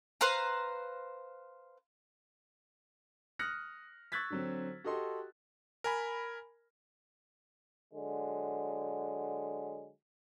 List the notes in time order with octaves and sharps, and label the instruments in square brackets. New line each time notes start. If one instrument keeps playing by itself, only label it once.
[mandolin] B4 C5 F5 A#5
[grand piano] D#6 F6 F#6 A#6 C#7
C#6 E6 F#6 G#6 A6 B6
D3 F#3 C4
F#4 G4 A4 D#5 C6
[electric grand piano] A#4 G#5 B5
[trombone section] D3 F#3 G#3